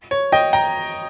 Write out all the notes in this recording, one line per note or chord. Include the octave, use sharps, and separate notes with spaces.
C#5
D#5 G5
G5 A#5